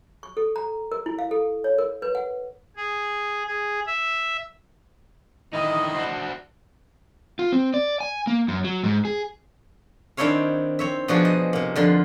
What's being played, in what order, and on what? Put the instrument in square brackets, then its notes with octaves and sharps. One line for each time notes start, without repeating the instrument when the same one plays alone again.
[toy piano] C#6
A4
A#5
A#4
E4
F5
A4
C#5
A#4
B4
F#5
[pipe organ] G#4
G#4
E5
[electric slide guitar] D3 D#3 D#4 [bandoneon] E4 D#5
[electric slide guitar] D4 F#4 C5
[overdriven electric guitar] F4
C4
D5
G#5
A#3
F#2
F#3
G#2
G#4
[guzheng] D#3 C4 D4 E4 C#5 F5
C4 C#5 E5
B2 F3 D4 D#4 F#4 G#4
D#5
C3 A#3
F2 D3 F4 C6